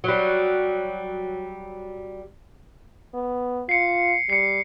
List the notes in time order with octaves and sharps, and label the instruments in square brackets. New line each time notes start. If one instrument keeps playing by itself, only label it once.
[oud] F#3 G3
[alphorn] B3
[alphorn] F4 [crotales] C7 C#7
[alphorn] G3 [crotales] C7 C#7